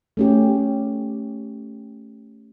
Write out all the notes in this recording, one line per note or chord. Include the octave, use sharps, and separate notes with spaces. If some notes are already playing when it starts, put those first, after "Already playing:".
A3 C#4 G4